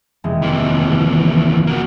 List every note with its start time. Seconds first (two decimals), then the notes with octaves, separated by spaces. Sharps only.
0.24 F1 E3 G#3
0.42 D#2 E3 C6 D6
1.67 A#3 F#4